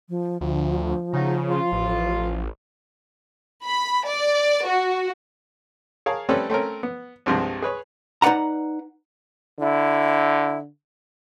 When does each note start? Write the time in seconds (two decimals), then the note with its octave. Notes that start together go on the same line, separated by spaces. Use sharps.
0.09 F3
0.41 D2 F3
1.13 C#3 F#3 A3 D#4
1.50 F4
1.72 A1
3.64 B5
4.07 D5
4.66 F#4
6.06 G#4 A#4 C#5 F5 A5
6.29 G3 A3 C4 C#4 A4 B4
6.50 A3 C4 C#4 A#4
6.83 B3
7.26 C2 G2 C3 F3 G#3
7.62 G#4 B4 C#5
8.22 D#4 B4 D5 F#5 A#5
9.59 D3 E4